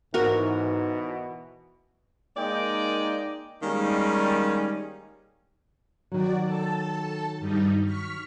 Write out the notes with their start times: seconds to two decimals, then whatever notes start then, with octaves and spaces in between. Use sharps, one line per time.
0.14 G#2 B2 E3 F#4 A#4
2.37 G#3 A#3 D#4 D5 D#5 G5
3.63 D#3 G3 G#3 A#3 C#4 D#4
6.12 D#3 F#3 F#4 D5
6.45 A4 A5
7.40 G2 G3 D#4
7.84 C#6 F6 B6